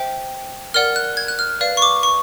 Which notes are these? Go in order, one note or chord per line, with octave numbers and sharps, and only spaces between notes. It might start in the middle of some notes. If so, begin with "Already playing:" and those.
Already playing: C5 E5 G5
A#4 D5 F#5 F6
F#6
G#6
F#6
F6
B4 D5 F5
C#6
D6
C#6